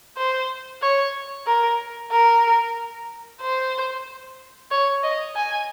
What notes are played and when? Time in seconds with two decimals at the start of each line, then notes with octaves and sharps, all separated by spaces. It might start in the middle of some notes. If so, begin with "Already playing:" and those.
0.17 C5
0.82 C#5
1.47 A#4
2.12 A#4
3.41 C5
4.71 C#5
5.03 D#5
5.36 G#5